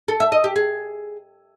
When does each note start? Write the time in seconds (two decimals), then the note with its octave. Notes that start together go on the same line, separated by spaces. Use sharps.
0.08 A4
0.20 E5
0.32 D#5
0.44 G4
0.56 G#4